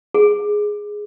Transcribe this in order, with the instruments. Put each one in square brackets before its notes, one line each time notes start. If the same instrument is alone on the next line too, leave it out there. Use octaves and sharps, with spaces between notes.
[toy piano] G#4